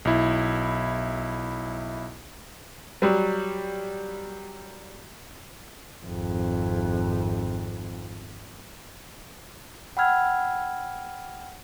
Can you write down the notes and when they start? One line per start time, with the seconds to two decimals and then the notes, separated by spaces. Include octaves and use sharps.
0.05 B1 E4
3.02 F#3 G3
6.06 G#1 F2
9.97 F#5 G5 B5 E6 F6 G#6